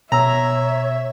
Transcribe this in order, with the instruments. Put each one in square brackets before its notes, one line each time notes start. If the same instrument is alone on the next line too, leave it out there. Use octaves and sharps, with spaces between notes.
[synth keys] B2 E6 [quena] C#5 [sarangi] E5 [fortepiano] A#5